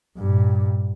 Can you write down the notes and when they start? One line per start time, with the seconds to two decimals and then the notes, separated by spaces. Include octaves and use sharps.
0.17 G2 A#2